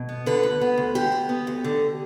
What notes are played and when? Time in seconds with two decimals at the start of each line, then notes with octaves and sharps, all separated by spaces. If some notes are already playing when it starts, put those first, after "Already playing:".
Already playing: B2
0.09 B3
0.26 D3 B4
0.43 D2
0.61 B3
0.78 D2
0.95 D3 G4
1.12 D2
1.29 B3
1.47 D2
1.64 D3